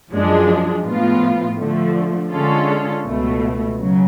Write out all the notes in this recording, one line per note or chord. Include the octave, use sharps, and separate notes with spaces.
F#2 F3 G#3 D4
A2 F3 B3 F4
D3 F3 A3
D3 G#3 C#4 F4 A4
C#2 B2 A3
C#3 F#3